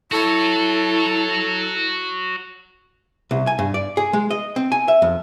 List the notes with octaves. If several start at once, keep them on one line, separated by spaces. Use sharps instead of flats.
E4 F#4 A4 C#5
C2
G#5
G2
D5
G#4
G#3
D#5
C4
G#5
E5
F2